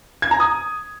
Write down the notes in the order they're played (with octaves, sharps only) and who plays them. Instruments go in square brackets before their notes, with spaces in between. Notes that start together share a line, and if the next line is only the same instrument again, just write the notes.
[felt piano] G#6
A#5
D#6